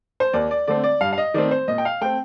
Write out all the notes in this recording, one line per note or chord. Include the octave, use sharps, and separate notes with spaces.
C5
D#2 D5
D5
D3 A3 C4 D5
D5
G2 F5
F5
D#5
D#3 A3 C4 D5
C5
A#2 D#5
G5
F5
A3 C4 G5